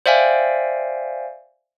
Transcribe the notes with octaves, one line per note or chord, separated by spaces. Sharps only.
C5 D5 E5 F5 G5 G#5